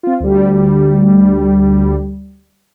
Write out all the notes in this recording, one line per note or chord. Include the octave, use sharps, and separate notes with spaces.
C4 F4
D2 G3